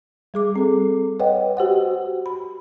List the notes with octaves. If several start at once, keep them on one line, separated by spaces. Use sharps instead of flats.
G3 G#4 D6
C4 A4
B4 C#5 D#5 F#5 G5
F#4 G4 C5 F#5
B5